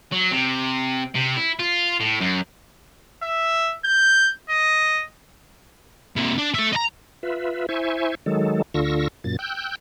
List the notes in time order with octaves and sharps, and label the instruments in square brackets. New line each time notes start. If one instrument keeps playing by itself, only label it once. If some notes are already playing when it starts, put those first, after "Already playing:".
[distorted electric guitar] F#3
C3
C3
E4
F4
A2
F#2
[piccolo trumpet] E5
G6
D#5
[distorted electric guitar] C3 A#3
D4
A4 E5
D#5 A#5
[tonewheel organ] F4 B4 E5
E4 C5 E5 G#5 C#6
D#3 F#3 G#3 A4
D2 D3 F4 C#6 E6 A#6
F#2 A#2 A6
G5 E6 F#6 G6